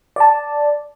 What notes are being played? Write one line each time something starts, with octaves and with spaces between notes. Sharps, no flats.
D5 A5